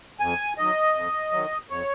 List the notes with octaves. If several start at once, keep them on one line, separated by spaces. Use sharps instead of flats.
F2 G#5
D#3 F#3 D#5
F2
D#3 F#3
F2 C#5